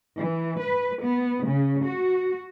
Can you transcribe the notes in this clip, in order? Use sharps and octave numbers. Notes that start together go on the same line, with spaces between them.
E3
B4
B3
C#3
F#4